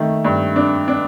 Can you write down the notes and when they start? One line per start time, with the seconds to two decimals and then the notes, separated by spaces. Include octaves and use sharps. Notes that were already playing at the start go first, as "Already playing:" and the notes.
Already playing: D#3 A3
0.25 G2
0.56 D4
0.88 D4